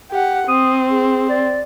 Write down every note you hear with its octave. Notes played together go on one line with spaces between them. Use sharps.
G4 F#5
C4 D#6
G#4
D5